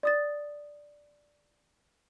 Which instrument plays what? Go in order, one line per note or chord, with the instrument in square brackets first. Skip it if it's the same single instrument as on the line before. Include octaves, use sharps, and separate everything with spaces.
[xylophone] D5 D#6 A6